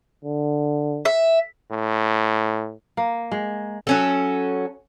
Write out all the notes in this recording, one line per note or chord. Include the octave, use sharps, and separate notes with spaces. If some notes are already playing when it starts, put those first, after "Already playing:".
D3
E5
A2
A#3
G#3
F#3 C#4 A4